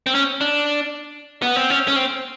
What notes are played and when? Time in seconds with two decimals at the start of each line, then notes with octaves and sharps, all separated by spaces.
0.06 C4
0.15 C#4
0.41 D4
1.42 B3
1.56 C4
1.70 C#4
1.88 C#4
1.96 C4